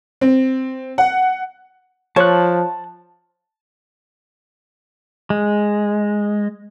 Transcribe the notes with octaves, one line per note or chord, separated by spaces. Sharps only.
C4
F#5
F3 C#5 A5 F#6
G#3